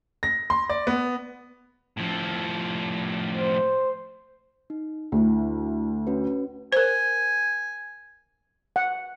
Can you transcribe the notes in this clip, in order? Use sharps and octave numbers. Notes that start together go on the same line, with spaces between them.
A#6
C6
D5
B3
A2 F3
C5
D#4
D2 D4 E4
C#4 F#4 B4
A#4 C5 G#5
F#5